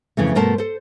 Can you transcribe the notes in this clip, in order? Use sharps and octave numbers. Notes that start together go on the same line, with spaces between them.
F2 C#3 E3 A3
G2 B2 A3 A#4 C5 A5
A4 C5